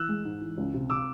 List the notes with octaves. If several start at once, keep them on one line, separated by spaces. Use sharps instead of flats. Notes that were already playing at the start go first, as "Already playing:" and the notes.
Already playing: E3 E6 F#6
G#3
G#2
E3
C#2
C3
C3 D6 E6